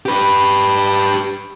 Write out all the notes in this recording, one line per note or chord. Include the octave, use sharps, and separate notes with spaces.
G4 B4